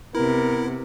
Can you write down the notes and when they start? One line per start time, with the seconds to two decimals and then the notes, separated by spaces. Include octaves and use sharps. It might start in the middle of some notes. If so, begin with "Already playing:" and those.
0.15 C3 B3 E4 A#4